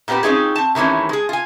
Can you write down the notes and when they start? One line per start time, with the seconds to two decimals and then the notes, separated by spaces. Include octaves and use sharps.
0.08 A#2 B3 C4 G4 B4
0.23 C4 C#4 D#4 F4 G#4
0.56 C4 A5
0.75 C3 D#3 E3 A3 C#4
1.09 G#3 G#4
1.29 F4 G#5